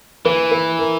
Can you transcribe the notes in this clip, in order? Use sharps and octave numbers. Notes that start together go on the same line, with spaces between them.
E3 B4
B4
A#4